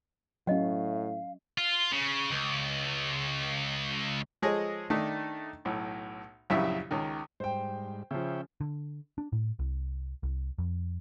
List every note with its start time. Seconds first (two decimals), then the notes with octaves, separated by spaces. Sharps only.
0.47 A2 F#3 C#4 D#5 F5 F#5
1.58 F4
1.92 C#3
2.30 C#2
4.42 F3 G#3 G#4 A4 C#5 D#5
4.90 D#3 A3 D4 D#4
5.65 B1 A2
6.50 A#1 F#2 C#3 G3 E4 E5
6.91 C#2 D#3
7.40 G#2 G3 C5 G5
8.11 C#3 F3 C#5 E5 G5
8.61 D3
9.18 D4
9.32 A2
9.59 C2
10.23 C2
10.58 F2